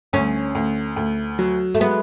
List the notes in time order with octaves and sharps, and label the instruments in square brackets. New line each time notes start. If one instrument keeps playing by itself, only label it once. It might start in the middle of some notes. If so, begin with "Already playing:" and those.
[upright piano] D2 [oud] C#4
[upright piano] D2
D2
F#3
[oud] A3
[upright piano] G#3 [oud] B3